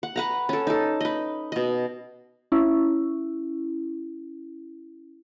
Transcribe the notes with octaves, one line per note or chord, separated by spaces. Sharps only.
F#5
B4 F#5 A#5
C#4 A4
D#4 A4
B4 D#5
B2 D#5
C#4 E4